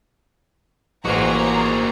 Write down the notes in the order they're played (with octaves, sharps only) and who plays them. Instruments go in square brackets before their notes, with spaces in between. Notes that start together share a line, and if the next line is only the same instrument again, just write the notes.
[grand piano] A1 [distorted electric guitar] A#3 F#4 [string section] G#4 C5 A#5